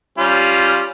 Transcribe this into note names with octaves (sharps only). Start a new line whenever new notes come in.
G3 C#4 F4